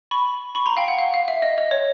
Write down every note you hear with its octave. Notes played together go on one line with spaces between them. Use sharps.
B5 C#6
B5 C#6
A#5 C6
F5 G5
F#5
F5
F5
E5
D#5
D#5
C#5